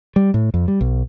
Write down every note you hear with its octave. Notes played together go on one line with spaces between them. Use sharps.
G3
A2
F2
G3
B1